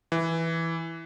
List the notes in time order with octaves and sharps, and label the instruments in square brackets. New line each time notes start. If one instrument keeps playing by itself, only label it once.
[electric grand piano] E3